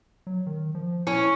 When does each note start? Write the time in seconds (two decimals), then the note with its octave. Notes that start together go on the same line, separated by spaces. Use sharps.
0.27 F#3
0.46 D#3
0.75 F3
1.07 C#4 E4